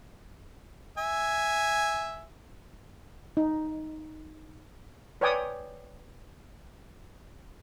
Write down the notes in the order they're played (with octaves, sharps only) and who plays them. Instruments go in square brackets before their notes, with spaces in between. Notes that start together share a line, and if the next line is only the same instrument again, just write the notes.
[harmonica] E5 G#5
[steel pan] D#4
B4 C#5 D5 G5 G#5 D#6